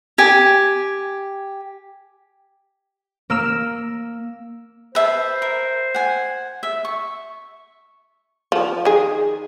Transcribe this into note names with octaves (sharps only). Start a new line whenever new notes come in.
G4 G#5
A#3 E6 E7
B4 C5 E5 A5
A#4
F#5 G#5
E5
C#6
F3
D#3 G#4